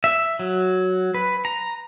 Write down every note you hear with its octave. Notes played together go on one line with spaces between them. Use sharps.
E5
F#3
B4
A#5